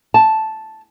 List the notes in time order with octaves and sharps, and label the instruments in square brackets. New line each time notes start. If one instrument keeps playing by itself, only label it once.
[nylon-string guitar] A5